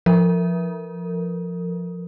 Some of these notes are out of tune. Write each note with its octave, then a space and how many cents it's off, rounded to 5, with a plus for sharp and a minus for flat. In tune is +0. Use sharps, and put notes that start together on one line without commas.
F3 +0 A#4 -40